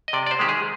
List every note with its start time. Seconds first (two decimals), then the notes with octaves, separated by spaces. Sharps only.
0.08 D#5
0.13 C3 D5
0.26 D5
0.31 C5
0.39 D#3 G#3 G4
0.49 G#4